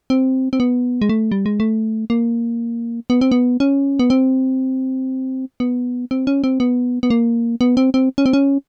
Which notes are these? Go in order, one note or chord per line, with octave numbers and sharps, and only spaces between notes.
C4
C4
B3
G#3
A3
G3
G#3
A3
A#3
B3
C4
B3
C#4
B3
C4
B3
C4
C#4
C4
B3
B3
A#3
B3
C4
C4
C#4
C4
C#4